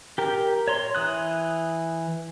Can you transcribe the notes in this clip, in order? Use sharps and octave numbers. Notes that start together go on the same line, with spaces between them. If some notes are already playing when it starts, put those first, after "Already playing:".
G4 A#4
C#5 A#5 C6
E3 D#6 F#6